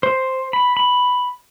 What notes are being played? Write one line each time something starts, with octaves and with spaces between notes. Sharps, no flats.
C5
B5
B5